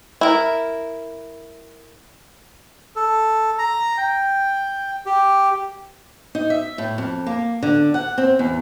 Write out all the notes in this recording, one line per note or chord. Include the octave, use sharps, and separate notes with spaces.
E4 A#4
A4
A#5
G5
G4
D#4
E5
A2
F2
A#3
D3
F#5
C4
E2